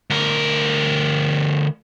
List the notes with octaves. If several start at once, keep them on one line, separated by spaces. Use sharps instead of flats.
D2 A#4